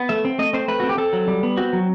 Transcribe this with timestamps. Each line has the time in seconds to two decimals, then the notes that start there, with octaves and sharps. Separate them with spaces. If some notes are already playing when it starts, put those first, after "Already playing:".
Already playing: B3
0.09 A3 E5
0.25 C4
0.39 A3 D#5
0.53 C4 C5
0.68 A3 B4
0.80 C4 F#4
0.89 G4
0.98 C4 A4
1.13 F#3
1.28 G3
1.43 B3
1.57 C4 F#4
1.73 F#3